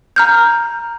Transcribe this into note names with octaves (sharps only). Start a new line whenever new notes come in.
A#5 F6 G6